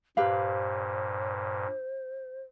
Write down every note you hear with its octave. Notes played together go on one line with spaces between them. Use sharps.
G2 A#2 G4 B4 C5 F5